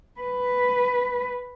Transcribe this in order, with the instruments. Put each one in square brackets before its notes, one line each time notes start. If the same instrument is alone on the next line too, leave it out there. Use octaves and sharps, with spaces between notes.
[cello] B4